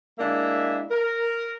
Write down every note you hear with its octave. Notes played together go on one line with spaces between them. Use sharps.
G#3 A#3 D4 E4 E5
A#4